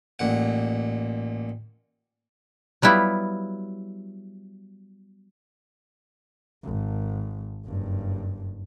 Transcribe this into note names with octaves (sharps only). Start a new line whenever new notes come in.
A1 A#2 F#5
F#3 G3 B3 E4 F4
G#1
F#1 G2